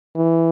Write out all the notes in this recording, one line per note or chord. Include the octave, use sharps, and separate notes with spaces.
E3